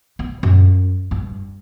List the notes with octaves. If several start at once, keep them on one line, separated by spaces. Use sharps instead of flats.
B3
F#2
G2